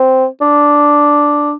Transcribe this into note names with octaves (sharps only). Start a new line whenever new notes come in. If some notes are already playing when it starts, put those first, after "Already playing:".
Already playing: C4
D4